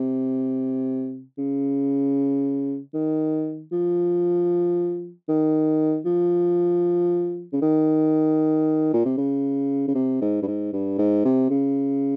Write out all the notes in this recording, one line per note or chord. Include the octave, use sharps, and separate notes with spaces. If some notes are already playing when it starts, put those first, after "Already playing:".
Already playing: C3
C#3
D#3
F3
D#3
F3
C#3
D#3
A#2
C3
C#3
C#3
C3
G#2
G2
G#2
G2
G#2
C3
C#3